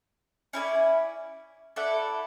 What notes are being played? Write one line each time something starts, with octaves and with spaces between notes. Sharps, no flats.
C#4 E4 A4 D5
E4 A4 D5 F#5